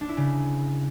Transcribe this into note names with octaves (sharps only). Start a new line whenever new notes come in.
D4
E4
C#3